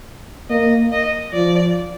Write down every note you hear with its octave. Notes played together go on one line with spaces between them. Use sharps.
A#3 D#5
D#5
F3 D5